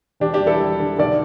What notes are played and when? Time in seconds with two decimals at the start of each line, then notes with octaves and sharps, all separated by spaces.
0.20 E1 D4 G4
0.34 D4 G4
0.40 G3
0.47 E4 A4
0.60 G3
0.79 D3
0.98 B1 A4 D5